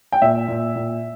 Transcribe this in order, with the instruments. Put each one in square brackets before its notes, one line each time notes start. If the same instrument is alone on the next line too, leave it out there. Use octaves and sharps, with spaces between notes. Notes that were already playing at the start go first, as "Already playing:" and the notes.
[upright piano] G5
A#2 E5
A#2
A#2